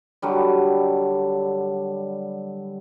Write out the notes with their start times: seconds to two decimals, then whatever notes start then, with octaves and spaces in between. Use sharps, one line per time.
0.22 D3 F#3 G3